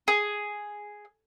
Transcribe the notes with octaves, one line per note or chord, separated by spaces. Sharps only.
G#4